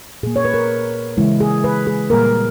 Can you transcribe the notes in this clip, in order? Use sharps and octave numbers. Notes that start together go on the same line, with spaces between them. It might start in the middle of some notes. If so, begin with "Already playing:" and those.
A#2 A#3 G#4
C#5
B4
A#4
C#3 E3 G#3 E4
G#4
B4
G#4
A#2 G3 A#3 A#4